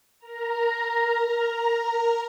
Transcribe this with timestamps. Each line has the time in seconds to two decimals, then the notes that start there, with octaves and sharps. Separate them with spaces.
0.19 A#4 A#5